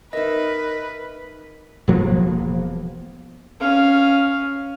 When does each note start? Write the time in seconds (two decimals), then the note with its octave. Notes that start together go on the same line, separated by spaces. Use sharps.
0.13 D#4 A#4 B4 D#5 E5
1.88 E1 F3 A#3 B3
3.60 C#4 F5